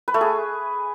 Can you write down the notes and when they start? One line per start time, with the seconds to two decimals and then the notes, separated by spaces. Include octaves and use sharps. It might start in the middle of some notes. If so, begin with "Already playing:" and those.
0.08 B4
0.14 A3
0.21 G#4